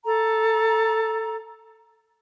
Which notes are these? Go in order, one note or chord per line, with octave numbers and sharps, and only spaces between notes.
A4 A#5